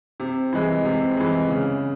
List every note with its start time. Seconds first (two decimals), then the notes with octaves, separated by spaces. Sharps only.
0.20 C3
0.53 E3 G#3
0.85 C3
1.17 E3 G#3
1.50 C#3